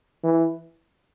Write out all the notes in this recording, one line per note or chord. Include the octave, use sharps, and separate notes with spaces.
E3